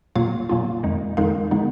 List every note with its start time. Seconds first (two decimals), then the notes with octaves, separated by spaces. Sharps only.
0.16 A#2 F#3 A#3 F4 F5
0.49 A#2 F#3 A#3 F4
0.83 F2 D#3 G#3 D#4
1.17 F2 D#3 G#3 D#4 F5
1.51 C#3 G#3 B3 D#4